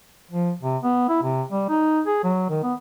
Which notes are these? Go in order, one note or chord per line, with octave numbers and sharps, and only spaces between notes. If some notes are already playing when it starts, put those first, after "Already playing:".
F3
C3
B3
E4
C3
G3
D#4
G#4
F#3
D#3
B3